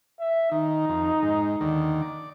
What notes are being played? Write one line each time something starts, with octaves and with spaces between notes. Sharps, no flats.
E5
D#3 D#4
F2
G#2
D#2 D3 D#3
D5